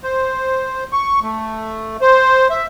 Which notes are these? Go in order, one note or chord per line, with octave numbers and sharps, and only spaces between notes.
C5
C#6
A3
C5
E5